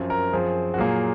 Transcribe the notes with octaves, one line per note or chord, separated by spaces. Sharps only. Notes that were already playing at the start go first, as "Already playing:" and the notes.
Already playing: F#2 F3 C4
A#4
F#2 F3 C4 G#4
F#4
A#2 F#3 A#3 G#4